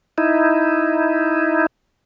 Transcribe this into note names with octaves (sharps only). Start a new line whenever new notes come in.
D#4 E4